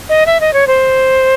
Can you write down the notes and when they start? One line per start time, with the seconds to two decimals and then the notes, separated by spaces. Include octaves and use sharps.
0.09 D#5
0.26 E5
0.41 D#5
0.53 C#5
0.67 C5